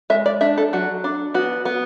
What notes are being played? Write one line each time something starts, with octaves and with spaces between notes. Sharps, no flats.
G#3 E5
D5
D4 E5
A4
F#3 F#4
D4
B3 F#4
B3